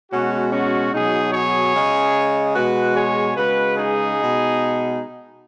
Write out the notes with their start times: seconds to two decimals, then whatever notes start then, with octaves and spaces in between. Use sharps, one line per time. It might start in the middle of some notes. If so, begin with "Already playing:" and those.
0.12 B2 G#3 C#4 F#4
0.52 C#4 F#4
0.93 B2 F#3 D#4 G#4
1.33 G#4 C#5
1.74 C#3 G#3
2.55 B2 G#3 F#4 B4
2.96 G#4 C#5
3.37 C#3 G#3 F#4 B4
3.78 D#4 G#4
4.18 B2 G#3